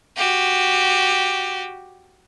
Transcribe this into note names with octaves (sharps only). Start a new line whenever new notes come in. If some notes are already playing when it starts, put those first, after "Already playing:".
F#4 G4